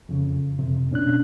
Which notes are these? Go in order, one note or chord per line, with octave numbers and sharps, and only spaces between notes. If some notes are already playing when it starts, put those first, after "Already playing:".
F2 C#3
F2 C3
B2 C#4 D4 F#6